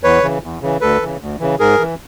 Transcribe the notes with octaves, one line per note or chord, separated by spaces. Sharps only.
E2 B4 C#5
C#3 E3
E2
C#3 E3
D2 A4 B4
C#3 E3
D2
C#3 E3
G#2 G#4 A#4
E3